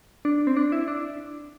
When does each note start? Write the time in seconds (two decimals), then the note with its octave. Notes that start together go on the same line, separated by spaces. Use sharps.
0.25 D4
0.47 C4
0.57 D4
0.72 E4
0.88 D4